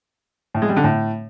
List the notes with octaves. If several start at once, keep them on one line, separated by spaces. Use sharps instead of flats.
A2
G#3
G3
D3
A2